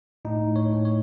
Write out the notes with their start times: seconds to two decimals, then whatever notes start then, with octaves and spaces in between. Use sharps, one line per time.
0.25 A2 D#4
0.47 A2
0.56 C#5
0.70 A2
0.85 C#5